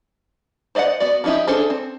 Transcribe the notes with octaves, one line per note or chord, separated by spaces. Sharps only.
C5 D5 D#5 F5 F#5
B3 F#4 D5
F3 C#4 D#4 E4 G4
C#4 D4 G#4 A4 C5
C4